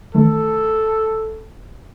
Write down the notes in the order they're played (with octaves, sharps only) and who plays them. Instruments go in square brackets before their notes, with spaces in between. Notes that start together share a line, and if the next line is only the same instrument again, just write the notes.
[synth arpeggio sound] D#3 E3 A3 [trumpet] A4